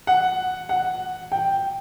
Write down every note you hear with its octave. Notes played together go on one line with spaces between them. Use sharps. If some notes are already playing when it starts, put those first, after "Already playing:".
F#5
F#5
G5